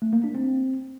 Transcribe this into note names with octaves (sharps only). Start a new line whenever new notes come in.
A3
A#3
D4
C4